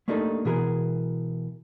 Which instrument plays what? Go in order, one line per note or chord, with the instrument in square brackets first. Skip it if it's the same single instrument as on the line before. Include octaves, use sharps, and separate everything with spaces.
[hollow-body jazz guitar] A3 A#3 D4 D#4 G4 A4
B2 E3 G#4 A#4